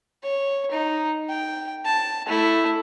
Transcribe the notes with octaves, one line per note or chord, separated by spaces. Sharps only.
C#5
D#4
G5
A5
A3 E4